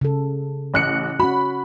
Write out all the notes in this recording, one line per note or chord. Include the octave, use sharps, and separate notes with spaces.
C#3 A4
A1 F#6 C#7
C#4 F#4 B5